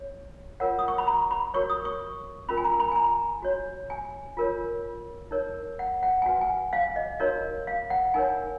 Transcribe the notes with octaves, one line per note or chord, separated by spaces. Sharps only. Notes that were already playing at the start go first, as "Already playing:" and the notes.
Already playing: C#5
F4 A#4 C#5 F#5
D#6
C#6
B5
A#5
B5
F#4 A#4 C#5 C#6
D#6
C#6
C#4 F4 A#4 B5
G#5
A#5
B5
G#5
A#5
F#4 C#5
G#5
F4 A#4 C#5
D#4 A#4 C#5
F#5
F#5
G#5
F#4 B4 F#5
G#5
F5
D#5
D#4 F#4 A#4 C#5 D#5
F5
F#5
D#4 A#4 C#5 G#5